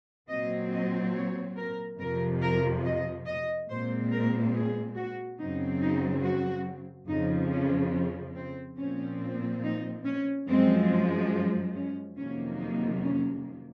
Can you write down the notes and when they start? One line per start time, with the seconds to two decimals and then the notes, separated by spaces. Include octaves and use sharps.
0.30 A#2 F#3 C4 D#5
0.72 D#5
1.14 C#5
1.57 A#4
1.99 F2 C3 F3 A#4
2.41 A#4
2.84 D#5
3.27 D#5
3.69 A#2 G#3 C4 C5
4.12 A#4
4.54 G#4
4.96 F#4
5.39 F#2 C#3 F#3 C4 D#4
5.81 D#4
6.23 F#4
7.08 F2 C#3 F3 D#4
7.51 C#4
7.93 C#4
8.35 C4
8.78 A#2 F3 C4 C#4
9.63 D#4
10.05 C#4
10.47 F#2 F3 G#3 C4
11.75 C#4
12.17 F2 C3 D#3 F#3 A#3 C#4
12.60 D#4
13.02 C#4